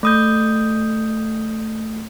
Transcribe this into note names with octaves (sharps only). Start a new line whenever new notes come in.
A3 D#6 G6